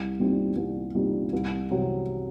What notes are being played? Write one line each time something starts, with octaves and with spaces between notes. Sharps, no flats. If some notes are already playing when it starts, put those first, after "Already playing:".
Already playing: C2
A#2 G3 C4 D#4
C2
A#2 G3 C4 D#4
C2
C3 F#3 C4